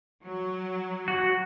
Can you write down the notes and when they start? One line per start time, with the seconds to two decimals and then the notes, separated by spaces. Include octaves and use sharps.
0.24 F#3
1.08 F#4